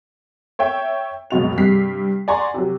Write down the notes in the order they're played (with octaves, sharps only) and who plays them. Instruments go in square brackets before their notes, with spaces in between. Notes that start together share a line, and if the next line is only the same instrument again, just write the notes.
[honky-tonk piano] C#5 E5 G5 C#6
C#2 F#2 B2 F7
G2 C3 B6 C7
D5 F#5 G#5 A#5 C6 C#6
C3 F#3